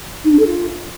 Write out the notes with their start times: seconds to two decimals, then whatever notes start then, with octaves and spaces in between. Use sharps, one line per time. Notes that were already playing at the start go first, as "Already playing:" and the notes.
0.24 D#4
0.32 D4
0.39 A4
0.46 F4